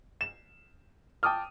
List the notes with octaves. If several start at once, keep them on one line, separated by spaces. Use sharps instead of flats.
E7
G5 A5 D6 D#6 F6